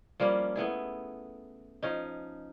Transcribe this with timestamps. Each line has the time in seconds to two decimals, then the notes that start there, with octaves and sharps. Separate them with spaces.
0.20 F3 G3 A#3 C#4
0.56 A3 B3 E4 G#4
1.83 F3 C#4 D#4